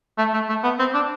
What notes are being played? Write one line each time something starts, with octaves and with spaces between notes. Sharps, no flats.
A3
A3
A3
B3
C4
D4